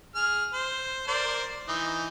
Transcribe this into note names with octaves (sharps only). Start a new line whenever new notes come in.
G#4 F6
C5
A#4 C5 D5
E3 D#4